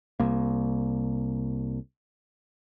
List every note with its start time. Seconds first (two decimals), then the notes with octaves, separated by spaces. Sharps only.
0.20 C2 A#3